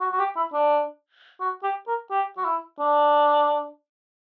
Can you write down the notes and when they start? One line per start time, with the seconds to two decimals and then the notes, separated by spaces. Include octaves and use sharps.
0.01 F#4
0.11 F#4
0.19 G4
0.37 E4
0.53 D4
1.40 F#4
1.63 G4
1.87 A#4
2.11 G4
2.37 F#4
2.45 E4
2.80 D4